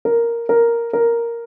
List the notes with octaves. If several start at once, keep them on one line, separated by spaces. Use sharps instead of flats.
A#4
A#4
A#4